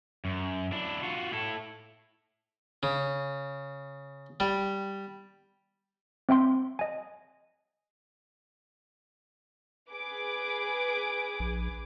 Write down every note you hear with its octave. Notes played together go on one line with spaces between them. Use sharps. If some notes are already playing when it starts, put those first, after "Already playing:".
F#2
D4 E4
F4 F#4
E4 A4
C#3
G3
C4 E5 G5 C6
D#5 G#5
G#4 B4 D6
A#1